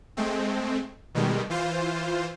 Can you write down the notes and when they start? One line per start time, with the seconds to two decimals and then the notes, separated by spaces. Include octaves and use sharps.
0.17 G#3 A3 C4
1.15 B2 D#3 G3 G#3
1.50 E3 F4 C5